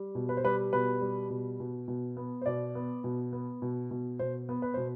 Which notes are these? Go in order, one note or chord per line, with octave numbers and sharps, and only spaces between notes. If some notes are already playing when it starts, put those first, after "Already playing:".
Already playing: G3
B2
B4
C5
G3 B4
B2 B4
G3
B2
B2
B2
B3
C5
B2 D5
B3
B2
B3
B2
B2
B2 C5
B3
B4
B2 C5